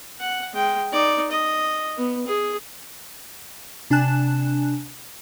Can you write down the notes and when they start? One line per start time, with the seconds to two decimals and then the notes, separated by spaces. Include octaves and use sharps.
0.20 F#5
0.54 G#3 G5
0.92 D#4 D5
1.31 D#5
1.97 B3
2.27 G#4
3.90 C3 D4 G#5 A5 F#6 E7